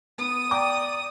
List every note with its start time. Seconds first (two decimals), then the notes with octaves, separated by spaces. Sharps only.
0.18 B3 D#6
0.51 D5 G5 A#5 D6